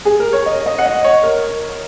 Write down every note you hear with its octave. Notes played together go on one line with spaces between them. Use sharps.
G#4
A#4
C#5
D#5
D#5
F#5
D#5
C#5
A#4